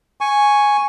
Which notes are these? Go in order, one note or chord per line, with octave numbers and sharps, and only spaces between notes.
G#5 C#6